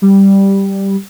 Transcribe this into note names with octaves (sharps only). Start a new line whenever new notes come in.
G3